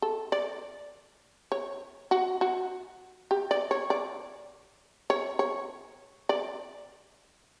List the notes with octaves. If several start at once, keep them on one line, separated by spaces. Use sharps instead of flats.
A4
D5
C#5
F#4
F#4
G4
D5
C#5
D5
C#5
C#5
D5